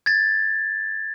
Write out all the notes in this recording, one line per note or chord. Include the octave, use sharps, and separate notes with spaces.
G#6 A6